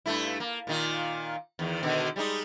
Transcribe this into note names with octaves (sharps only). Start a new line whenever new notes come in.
G2 A3 E4
A#3
A#2 D#3 F4
E2 D#3
B2 D3 D#3
G3 G#3 D#4